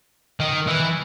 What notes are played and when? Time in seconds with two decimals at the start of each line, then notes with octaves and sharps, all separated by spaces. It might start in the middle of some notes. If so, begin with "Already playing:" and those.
0.40 D#3
0.67 E3